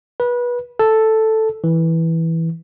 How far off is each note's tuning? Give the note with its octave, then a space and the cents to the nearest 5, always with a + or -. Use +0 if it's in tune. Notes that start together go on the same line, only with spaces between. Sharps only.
B4 -25
A4 +0
E3 -10